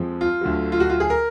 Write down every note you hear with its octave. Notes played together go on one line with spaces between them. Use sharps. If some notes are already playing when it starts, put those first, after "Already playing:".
Already playing: F2 F3 G#3
F4
D2 D3 F#3
F4
F#4
F4
G#4
A#4